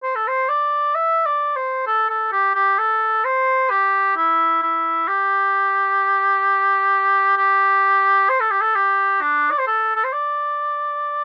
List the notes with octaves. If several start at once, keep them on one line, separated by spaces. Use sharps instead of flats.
C5
A4
C5
D5
E5
D5
C5
A4
A4
G4
G4
A4
C5
G4
E4
E4
G4
G4
C5
A4
G4
A4
G4
D4
D5
C5
A4
A4
C5
D5